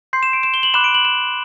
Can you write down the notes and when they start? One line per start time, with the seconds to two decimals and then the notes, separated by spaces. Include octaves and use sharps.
0.13 C6 G6 C7
0.23 E7
0.33 D7
0.43 E7
0.54 G7
0.63 F#7
0.74 B5 D6 F#6 E7
0.84 D7
0.94 F#7
1.05 E7